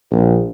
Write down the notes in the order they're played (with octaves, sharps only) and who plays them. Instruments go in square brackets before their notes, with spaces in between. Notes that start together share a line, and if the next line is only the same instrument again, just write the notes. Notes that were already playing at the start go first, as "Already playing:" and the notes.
[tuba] A#1